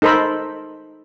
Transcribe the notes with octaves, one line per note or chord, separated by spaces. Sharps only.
D#4 A4 A#4 C5 B5